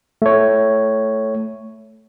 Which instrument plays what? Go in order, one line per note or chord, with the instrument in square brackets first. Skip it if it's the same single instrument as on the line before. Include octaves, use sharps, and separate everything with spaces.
[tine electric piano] A3 C#5